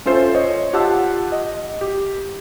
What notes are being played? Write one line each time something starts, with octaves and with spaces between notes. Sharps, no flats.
C#4 F4 A4 C5 E5
C5 C#5 D#5
F4 G4 F#5 A5 E6
D#5
G4